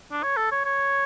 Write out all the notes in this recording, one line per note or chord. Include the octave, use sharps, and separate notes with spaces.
D4
C#5
A4
C#5
C#5